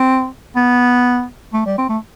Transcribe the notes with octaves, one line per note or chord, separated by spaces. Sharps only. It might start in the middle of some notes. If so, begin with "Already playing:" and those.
Already playing: C4
B3
A3
G3
C4
A3